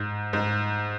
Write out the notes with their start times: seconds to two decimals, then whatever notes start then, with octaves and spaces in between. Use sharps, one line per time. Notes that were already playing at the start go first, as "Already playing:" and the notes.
Already playing: G#2
0.33 G#2